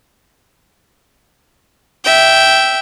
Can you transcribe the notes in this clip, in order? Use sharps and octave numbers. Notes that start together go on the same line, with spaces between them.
E5 G5